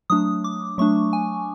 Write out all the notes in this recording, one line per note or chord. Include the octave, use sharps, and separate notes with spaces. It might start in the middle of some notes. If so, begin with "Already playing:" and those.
F#3 A3 D4 D#6
D6
F#3 A3 D4 C#6
G#5